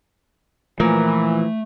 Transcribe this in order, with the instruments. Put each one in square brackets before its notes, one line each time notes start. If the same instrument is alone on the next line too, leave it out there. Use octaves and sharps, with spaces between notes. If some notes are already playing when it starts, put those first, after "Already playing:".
[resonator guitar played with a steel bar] A#2 A#4 [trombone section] E3 [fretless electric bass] F3 A#3 [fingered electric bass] A3